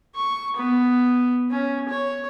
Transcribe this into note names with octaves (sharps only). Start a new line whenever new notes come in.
C#6
B3
C#4
C#5